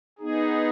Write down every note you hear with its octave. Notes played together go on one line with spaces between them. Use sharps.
B3 D#4 G#4